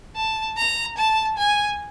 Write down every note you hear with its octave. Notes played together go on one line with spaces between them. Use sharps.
A5
A#5
A5
G#5